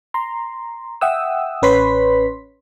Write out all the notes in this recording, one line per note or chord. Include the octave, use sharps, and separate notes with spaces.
A#5 C6
E5 F#5 G5 D#6 E6
A1 C#4 B4 C#5 C6 B6